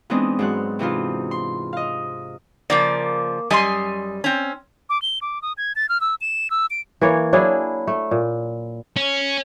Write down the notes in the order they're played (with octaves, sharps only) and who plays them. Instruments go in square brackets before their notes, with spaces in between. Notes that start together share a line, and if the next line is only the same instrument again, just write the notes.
[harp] E3 G#3 B3 C4 D4 D#4
G#2 F#3 F#6
C3 E3 D#4 F4
C6
D#5 F5
[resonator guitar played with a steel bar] C#3 F3 D5 [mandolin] A#3
[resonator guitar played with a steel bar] F#2 G3 G#5 [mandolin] D#5 C6
[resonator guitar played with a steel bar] C4 C#4
[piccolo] D6
G7
D6
D#6
G#6
A6
F6
E6
E7
E6
D7
[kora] E3 A#3 C#5
F#3 D4 E4 G#4
A3
A#2
[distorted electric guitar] C#4